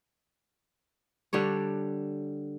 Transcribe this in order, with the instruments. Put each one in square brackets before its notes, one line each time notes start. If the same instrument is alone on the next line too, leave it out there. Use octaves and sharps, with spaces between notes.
[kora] D3 G3 D4 C#5